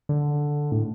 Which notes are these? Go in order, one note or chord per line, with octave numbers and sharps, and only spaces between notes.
D3
A2